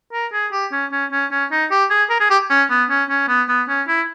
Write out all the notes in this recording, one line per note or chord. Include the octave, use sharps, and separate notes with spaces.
A#4
G#4
G4
C#4
C#4
C#4
C#4
D#4
G4
G#4
A#4
G#4
G4
C#4
B3
C#4
C#4
B3
B3
C#4
E4